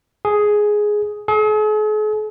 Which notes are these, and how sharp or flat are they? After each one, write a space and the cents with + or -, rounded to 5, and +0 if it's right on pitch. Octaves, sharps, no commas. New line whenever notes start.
G#4 +5
G#4 +45